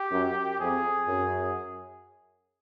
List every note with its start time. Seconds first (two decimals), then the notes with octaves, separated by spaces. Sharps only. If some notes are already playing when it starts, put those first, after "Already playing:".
Already playing: G4
0.12 F#2
0.60 F2 G#4
1.08 F#2